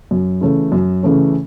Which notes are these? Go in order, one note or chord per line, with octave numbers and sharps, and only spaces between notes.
F#2
C#3 E3 A3 C#4
F#2
C#3 E3 A3 C#4